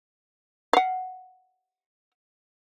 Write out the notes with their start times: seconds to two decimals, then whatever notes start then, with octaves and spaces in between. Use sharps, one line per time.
0.73 F5 F#5